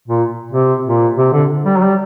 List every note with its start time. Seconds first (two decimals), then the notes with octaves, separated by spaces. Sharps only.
0.08 A#2
0.52 C3
0.85 A#2
1.18 C3
1.33 D3
1.65 G3
1.77 F#3
1.83 G3